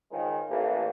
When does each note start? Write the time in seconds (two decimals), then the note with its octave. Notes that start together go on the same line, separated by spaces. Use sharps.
0.12 C#2 G#2 D#3 F3 G#3 A#4
0.49 A1 A#3